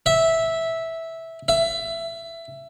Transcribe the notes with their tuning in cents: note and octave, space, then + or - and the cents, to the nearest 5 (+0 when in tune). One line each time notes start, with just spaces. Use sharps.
E5 -10
E5 +15